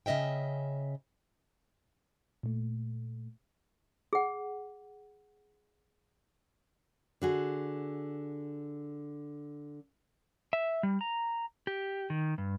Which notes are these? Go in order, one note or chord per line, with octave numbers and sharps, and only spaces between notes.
C#3 C#4 D#5 E5 G5
A#2 A3
G#4 F#5
D3 F#4 G#4
E5
G3
A#5
G4
D#3
G2